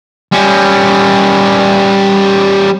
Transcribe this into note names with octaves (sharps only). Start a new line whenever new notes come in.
G3 C#4